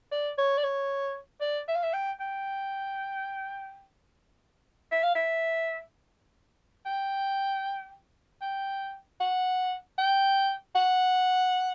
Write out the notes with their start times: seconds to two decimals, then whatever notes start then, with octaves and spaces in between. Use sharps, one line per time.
0.12 D5
0.38 C#5
0.58 D5
0.64 C#5
1.41 D5
1.68 E5
1.75 F5
1.83 E5
1.94 G5
2.20 G5
4.92 E5
5.03 F5
5.15 E5
6.86 G5
8.42 G5
9.21 F#5
9.99 G5
10.76 F#5